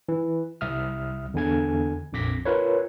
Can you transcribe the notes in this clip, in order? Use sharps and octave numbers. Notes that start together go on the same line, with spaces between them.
E3
C2 E5 D#6 F6
E2 D3 G#5 G#6
A#1 F2 D6 A#6 B6
F4 A#4 B4 C#5